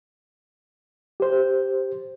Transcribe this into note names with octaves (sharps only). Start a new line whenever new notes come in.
G4 C5